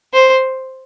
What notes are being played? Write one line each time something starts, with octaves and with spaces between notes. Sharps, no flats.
C5